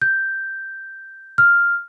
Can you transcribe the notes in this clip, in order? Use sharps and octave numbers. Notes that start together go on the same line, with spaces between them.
G6
F6